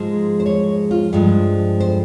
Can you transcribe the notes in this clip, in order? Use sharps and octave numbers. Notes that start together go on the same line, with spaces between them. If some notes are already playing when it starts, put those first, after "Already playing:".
Already playing: G#2 F3 G#3 C5
C5
C#5
F4
G2 F3 G#3
C5